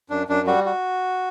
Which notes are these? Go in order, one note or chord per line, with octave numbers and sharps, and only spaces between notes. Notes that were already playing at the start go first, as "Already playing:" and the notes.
F#2 D4
F#2 D4
G3 F#4
F#4